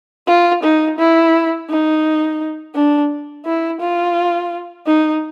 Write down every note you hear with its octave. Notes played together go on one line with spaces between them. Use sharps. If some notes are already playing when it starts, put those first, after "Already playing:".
F4
D#4
E4
D#4
D4
E4
F4
D#4